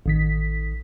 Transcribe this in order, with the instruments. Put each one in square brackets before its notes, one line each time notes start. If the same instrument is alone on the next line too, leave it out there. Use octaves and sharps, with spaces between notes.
[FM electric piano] A1 D#3 B6